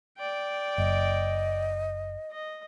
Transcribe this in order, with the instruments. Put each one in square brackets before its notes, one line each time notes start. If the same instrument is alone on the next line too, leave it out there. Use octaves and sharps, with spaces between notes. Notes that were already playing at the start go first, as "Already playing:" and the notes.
[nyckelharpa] D5 G5
[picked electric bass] F#1 [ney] D#5
[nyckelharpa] D#5